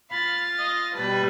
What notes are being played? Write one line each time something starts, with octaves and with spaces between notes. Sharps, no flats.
F4 F5 B5 A6
D#5
B2 G3 B4 A5